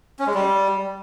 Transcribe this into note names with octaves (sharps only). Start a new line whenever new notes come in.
C#4
G#3
G3